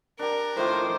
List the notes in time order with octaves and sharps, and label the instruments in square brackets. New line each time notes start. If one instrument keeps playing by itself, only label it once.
[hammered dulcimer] D4 G4 [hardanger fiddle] A#4
[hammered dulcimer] A2 D#3 D6 [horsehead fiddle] F4 C5